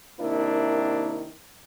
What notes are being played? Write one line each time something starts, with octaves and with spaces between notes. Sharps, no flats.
C3 D#3 A#3 D4 E4 A#4